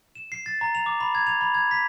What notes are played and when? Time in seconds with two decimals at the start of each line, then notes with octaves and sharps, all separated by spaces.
0.15 E7
0.32 C7
0.46 A6
0.61 A#5
0.75 F7
0.86 D6
1.00 B5
1.15 G#6
1.27 F7
1.41 B5
1.54 G#6
1.71 B6